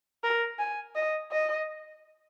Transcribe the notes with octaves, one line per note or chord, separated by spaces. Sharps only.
A#4
G#5
D#5
D#5